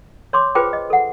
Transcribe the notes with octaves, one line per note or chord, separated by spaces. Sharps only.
C#5 C6 D6
F4 G#4 B4 C5 G5 D6
D#5
A4 F#5